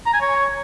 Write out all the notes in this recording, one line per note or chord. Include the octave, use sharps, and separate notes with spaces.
A#5
G#5
C#5